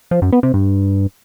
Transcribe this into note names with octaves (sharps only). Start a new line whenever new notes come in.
F3
F#2
B3
C3
G2